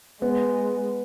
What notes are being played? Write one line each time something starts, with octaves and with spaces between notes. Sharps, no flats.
G#3 B3